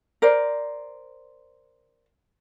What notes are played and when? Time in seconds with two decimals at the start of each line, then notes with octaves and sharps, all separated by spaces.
0.22 A#4 C5 D5